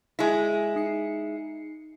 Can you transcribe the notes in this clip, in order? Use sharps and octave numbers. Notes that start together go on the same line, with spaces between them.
G#3 E4
D#4 C7 C#7